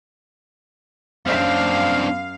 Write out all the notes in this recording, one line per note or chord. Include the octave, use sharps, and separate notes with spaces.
F#2 C4 D4 F5